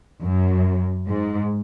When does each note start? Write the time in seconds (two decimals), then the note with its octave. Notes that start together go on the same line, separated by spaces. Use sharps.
0.23 F#2
1.08 G#2